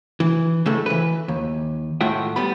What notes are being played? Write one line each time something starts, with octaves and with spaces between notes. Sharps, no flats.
E3
C#3 G#3 A3
E3 B4
D#2
A2 G#3 F4 E5 F#5 G5
G3 B3 B5